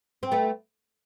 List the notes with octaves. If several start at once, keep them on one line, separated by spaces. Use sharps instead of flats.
C4
A3 B3